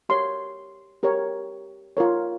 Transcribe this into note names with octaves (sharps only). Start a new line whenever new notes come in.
G4 A#4 C#5 C6
G4 A#4 C#5
F4 A#4 C#5